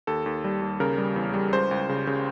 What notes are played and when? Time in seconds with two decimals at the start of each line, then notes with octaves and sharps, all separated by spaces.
0.07 D#2 A4
0.26 D#2
0.44 G3
0.62 D#2
0.80 C#3 A#4
0.98 G3
1.16 E2
1.34 G3
1.52 C#2 C5
1.71 C#2
1.89 C#3
2.07 C#3